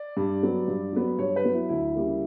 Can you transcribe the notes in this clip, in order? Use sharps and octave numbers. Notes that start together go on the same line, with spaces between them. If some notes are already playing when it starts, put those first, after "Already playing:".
Already playing: D5
G2
F#3 B3
G2
F#3 B3
G2 C#5
B4
F#3 B3
E4
D2 E4
C#3 G3 A#3